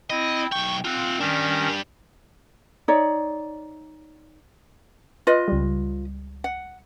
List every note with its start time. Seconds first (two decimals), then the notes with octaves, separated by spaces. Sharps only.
0.10 C4 E4 D#5
0.52 B1 G5 C#6
0.85 C4 F4 F#5
1.20 D#3 G3 C#4 D4
2.88 D#4 C#5 D5
5.27 F4 B4 D#5
5.48 C#2 G3
6.44 F#5